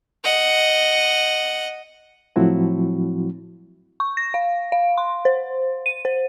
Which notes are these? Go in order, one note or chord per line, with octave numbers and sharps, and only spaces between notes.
D#5 F#5
A2 F3 F#3 C4 E4 F#4
C#6
A#6
F5
F5
C6
C5
D#7
C5